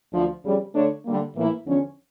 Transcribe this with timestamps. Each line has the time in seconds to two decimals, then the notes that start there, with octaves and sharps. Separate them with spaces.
0.13 D2 D3 F3
0.43 F2 C#3 G3
0.74 D3 A3 D4 A4 C#5
1.04 D3 G3 A#3
1.35 A2 E3 A#3 E4
1.65 E2 D3 F3 C#4